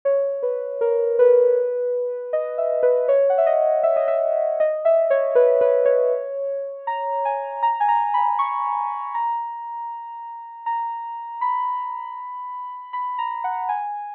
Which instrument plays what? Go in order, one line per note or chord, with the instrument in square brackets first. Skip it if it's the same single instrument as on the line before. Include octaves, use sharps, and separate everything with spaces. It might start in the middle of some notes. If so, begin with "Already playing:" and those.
[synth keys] C#5
B4
A#4
B4
D#5
E5
B4
C#5
F#5
E5
D#5
E5
D#5
E5
D#5
E5
C#5
B4
B4
C#5
A#5
G#5
A#5
G#5
A#5
B5
C#6
A#5
A#5
B5
B5
A#5
F#5
G#5